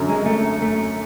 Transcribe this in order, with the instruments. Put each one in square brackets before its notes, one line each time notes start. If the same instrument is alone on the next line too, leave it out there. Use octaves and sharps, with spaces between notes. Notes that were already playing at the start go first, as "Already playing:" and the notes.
Already playing: [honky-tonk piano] F#2 D3
[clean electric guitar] G#3
A3
A3